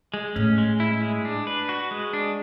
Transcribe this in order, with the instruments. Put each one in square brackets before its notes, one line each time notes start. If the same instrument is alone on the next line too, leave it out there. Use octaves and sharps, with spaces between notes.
[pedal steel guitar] G#3
[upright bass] A2 [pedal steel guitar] C#4
[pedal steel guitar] G#3
E4
G#3
D4
B4
F#4
G#3
D4